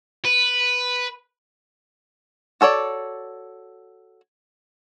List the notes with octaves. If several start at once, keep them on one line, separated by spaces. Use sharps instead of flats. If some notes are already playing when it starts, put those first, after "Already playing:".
B4
F#4 A4 C#5 D5